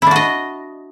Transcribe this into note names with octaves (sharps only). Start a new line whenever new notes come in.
D4 E4 F#4 D#5